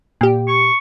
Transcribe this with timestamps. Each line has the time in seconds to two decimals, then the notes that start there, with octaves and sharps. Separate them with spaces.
0.21 A#2 G4
0.48 C#6